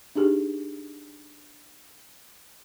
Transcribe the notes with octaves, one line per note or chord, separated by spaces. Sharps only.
D4 D#4 G4 G#4